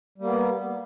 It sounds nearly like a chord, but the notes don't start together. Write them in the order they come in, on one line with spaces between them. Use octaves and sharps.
G3 A#3 B3